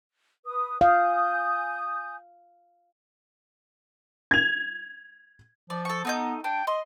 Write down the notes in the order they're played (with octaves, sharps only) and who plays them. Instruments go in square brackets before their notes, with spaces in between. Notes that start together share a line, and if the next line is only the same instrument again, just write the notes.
[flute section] B4 D#6
[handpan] F5 [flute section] G#5 D#6 G6
[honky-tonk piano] G#6 F7
[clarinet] F3 [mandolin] D5
[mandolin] A4 C#6
[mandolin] A3 D#4 G6 [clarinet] B3
[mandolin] D4 [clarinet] G5
[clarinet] D#5 [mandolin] C6